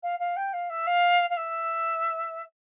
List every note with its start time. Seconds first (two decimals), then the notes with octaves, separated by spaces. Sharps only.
0.03 F5
0.19 F5
0.36 G5
0.53 F5
0.70 E5
0.87 F5
1.30 F5
1.37 E5